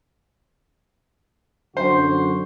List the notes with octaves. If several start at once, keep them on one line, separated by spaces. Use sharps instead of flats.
F#2 D3 F#4 C5